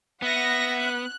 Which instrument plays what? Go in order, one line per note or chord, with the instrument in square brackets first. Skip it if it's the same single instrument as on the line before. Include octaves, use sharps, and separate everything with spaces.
[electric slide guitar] B3 [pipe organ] E5 [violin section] F#5 A#6
[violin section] F#6